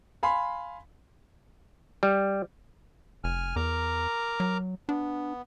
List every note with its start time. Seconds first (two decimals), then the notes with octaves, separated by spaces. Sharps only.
0.23 F5 G#5 B5 C6
2.03 G3
3.24 F1 G#5 F6
3.56 E2 A#4 A#5 D6
4.40 F#3
4.89 B3 D4